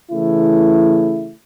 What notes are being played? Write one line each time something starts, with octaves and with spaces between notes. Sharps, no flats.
C#3 E3 A3 E4